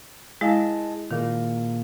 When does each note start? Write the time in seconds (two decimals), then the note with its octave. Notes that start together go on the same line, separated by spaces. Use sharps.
0.41 G#3 E4 G#4 D#5 F5 A5
1.11 A#2 D#3 A#3 G#4